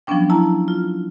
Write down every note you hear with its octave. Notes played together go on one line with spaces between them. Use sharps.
F3 F#3 B3 C#4 D4 G5
E4 A5 A#5
F4